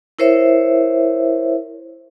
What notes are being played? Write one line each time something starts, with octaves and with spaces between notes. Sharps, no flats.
E4 A#4 C5 C#5 E5